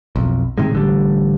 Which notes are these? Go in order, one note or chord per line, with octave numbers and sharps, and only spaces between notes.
B1 F2
A2 C3 D#3 G#3
A1 D3 G3